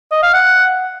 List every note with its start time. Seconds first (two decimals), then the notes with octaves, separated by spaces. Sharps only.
0.11 D#5
0.22 F5
0.34 F#5